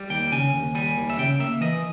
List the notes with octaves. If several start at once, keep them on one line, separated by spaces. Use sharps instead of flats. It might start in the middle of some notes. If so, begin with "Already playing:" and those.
Already playing: G3
D#2 G5
C#3 G#5
D#2
G3 G#5
D#2
E5
C#3 G5
A#3 E5
E3 D#5